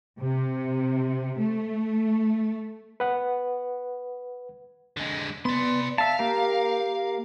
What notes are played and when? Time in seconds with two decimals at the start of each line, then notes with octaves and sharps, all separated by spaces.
0.20 C3
1.38 A3
3.00 B4 F#5
4.97 D3 G#3
5.45 B3 D5 C6
5.98 E5 F5 A5
6.19 A#3 G4 A#4